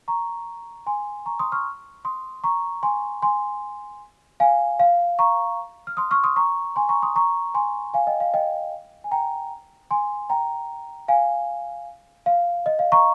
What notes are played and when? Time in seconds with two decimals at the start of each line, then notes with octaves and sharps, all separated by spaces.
0.08 A#5 C#6
0.87 G#5 C6
1.26 A#5 C#6
1.39 C6 D#6
1.52 C#6 F6
2.05 C6 D#6
2.44 A#5 C#6
2.83 G#5 C6
3.22 G#5 C6
4.40 F5 G#5
4.79 F5
5.19 A#5 C#6
5.87 F6
5.97 C6 D#6
6.11 C#6 F6
6.24 C6 D#6
6.36 A#5 C#6
6.76 G#5 C6
6.89 A#5 C#6
7.02 C6 D#6
7.15 A#5 C#6
7.54 G#5 C6
7.94 F5 G#5
8.07 D#5 G5
8.20 F5
8.34 D#5 G5
9.04 G#5
9.11 G5 A#5
9.91 G#5 C6
10.30 G5 A#5
11.08 F5 G#5
12.26 F5
12.66 D#5
12.79 F5
12.92 A#5 C#6